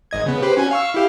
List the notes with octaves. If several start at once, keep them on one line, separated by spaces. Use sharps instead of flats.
G#1 D#5 G#6
C#3 B3
G4 B4 C5
C#4 F#4 G#5
F5 C#6 E6
E4 G4 F5